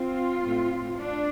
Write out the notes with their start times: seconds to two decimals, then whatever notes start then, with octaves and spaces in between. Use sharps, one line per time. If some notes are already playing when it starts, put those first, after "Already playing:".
Already playing: C4 F4
0.44 A2 A3 C4
0.99 D4